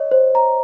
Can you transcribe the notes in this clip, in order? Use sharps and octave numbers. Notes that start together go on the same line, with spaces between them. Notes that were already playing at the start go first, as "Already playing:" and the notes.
Already playing: C#5 D#5
C5
A#5